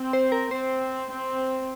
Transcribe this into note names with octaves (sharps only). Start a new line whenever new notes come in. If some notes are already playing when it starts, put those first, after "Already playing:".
Already playing: C4
C5
A#4
C4 C5
C4